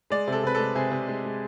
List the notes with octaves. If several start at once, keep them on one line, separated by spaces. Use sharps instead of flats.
G#3 D5
C3
A4
C3 B4
G#3 A4
C3 G#4
C3
G#3
G#3